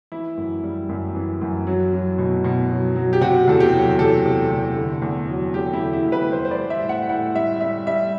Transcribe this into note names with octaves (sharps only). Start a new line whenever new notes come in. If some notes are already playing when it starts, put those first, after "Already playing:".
E3 E4
F#2
G3
F#2
E3
F#2
F#3
F#3
B2
B2
F#3
F#3
G4
C3 F#4
E2 A4
G4
F#3
E2 A4
C3
E2
D3
E2
F#3
E2 G4
E4
D3
E4
E2
B4
G3 C5
C5
D5
G3
E5
A2
F#5
A2 F#5
G3 E5
G3 E5
G3 E5